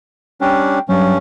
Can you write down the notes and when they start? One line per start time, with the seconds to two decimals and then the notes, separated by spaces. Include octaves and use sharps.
0.41 G3 C#4 D4 G5
0.89 G2 F#3 C#4